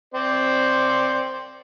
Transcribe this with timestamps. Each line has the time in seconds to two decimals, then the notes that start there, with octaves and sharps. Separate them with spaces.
0.14 C4 C5 D5